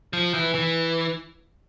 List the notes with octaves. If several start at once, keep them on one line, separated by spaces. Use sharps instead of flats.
F3
E3
E3